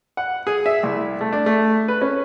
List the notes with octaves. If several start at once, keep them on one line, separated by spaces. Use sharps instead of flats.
F#5
G#4
E5
C2
A3
D4
A3
B4
C#4